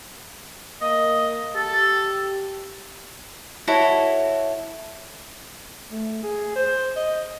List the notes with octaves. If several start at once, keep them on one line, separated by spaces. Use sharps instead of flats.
A#3 D#5
G4 A4
E4 F#4 A4 C#5
A3
G#4
C5
D#5